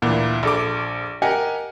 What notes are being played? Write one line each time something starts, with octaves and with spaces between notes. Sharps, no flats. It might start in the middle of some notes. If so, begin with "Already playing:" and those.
D2 A#2 E3
A#1 A4 D6
G4 A#4 D#5 F#5 G#5